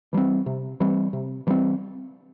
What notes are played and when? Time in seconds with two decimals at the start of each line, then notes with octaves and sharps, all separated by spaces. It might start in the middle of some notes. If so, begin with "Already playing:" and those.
0.13 E3 G3 C4
0.46 C3
0.80 E3 G3 C4
1.13 C3
1.47 E3 G3 C4